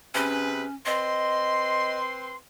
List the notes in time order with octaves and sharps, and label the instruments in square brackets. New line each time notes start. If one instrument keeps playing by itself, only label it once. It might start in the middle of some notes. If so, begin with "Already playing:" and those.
[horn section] C3 G#4 B4 [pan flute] C#4
[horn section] C4 B4 C6 [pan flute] D#5